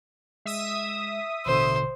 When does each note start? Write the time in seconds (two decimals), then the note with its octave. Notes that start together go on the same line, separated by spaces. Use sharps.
0.46 G#3 E5 D#6
1.46 A1 B2 D3 C5